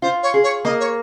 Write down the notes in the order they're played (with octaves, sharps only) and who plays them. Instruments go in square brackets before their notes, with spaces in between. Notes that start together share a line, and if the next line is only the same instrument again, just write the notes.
[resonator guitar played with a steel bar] F4 [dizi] C5
[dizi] C#5
[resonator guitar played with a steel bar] G#4
[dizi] C#5
[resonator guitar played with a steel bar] A#3 [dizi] D#5
[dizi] C#5